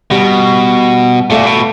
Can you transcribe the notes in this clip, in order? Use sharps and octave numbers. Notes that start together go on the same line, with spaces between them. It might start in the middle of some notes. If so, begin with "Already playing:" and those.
B2 G3
A#2 A3
B2